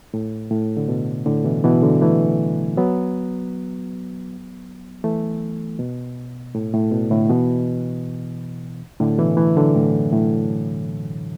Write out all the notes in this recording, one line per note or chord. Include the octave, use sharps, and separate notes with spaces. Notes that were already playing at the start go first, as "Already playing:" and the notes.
A2
A2
D3
B2
A2 D3
B2 E3
B2 E3
D3 F#3
E3 A3
F#3 B3
E3 A3
B2
A2
A2
B2
A2 D3
B2 E3
A2 D3
B2 E3
E3 A3
D3 F#3
A2
F#2
A2